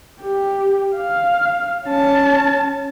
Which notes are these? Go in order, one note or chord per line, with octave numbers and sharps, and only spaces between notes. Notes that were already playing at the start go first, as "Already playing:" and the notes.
G4
F5
C#4 A5